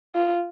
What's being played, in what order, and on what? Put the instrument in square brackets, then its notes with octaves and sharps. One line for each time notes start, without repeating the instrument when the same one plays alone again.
[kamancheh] F4